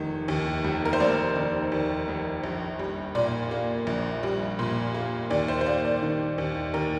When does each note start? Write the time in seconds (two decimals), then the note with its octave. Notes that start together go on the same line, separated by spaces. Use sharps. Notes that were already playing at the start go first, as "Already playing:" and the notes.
Already playing: F1 D#3
0.28 D#2
0.64 F1
0.85 A#4
0.93 C5
1.00 F1 D5
1.36 D#3
1.72 D#2
2.08 F1
2.44 A#1
2.79 G3
3.15 A#2 D5
3.51 A#3
3.87 A#1
4.23 G3
4.59 A#2
4.94 A#3
5.30 D#2 D5
5.48 C5
5.61 C5
5.66 A#3 D5
5.85 D5
6.03 D#3
6.38 D#2
6.74 D#2 A#4